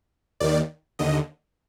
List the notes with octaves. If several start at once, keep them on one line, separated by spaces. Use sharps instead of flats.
D#2 D#3 D5
D#2 D3 D#5